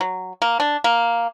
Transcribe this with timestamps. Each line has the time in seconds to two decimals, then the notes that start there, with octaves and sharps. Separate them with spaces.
0.01 F#3
0.42 A#3
0.60 D4
0.84 A#3